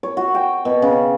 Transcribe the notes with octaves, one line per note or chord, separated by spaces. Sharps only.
C#5
F#4
G5
B2
C#3